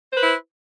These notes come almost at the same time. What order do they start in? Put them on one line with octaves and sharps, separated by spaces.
C5 B4 E4